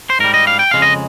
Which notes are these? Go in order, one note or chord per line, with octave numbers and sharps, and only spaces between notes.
C5
G#2 G3 A#4
D#5
F5
G5
F2 C#3 G#3 F5
D#5